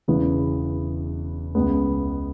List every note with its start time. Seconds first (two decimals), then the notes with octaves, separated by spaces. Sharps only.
0.08 E1 E2 C#3 E3 B3
1.55 C#2 C#3 G#3 B3